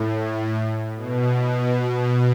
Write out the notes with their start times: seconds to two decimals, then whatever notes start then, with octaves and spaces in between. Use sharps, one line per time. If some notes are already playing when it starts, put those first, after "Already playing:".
Already playing: A2
0.96 B2
1.38 B2